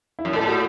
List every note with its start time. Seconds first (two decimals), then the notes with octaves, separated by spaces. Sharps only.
0.19 E4
0.25 F#2
0.33 A2 A4
0.48 F#4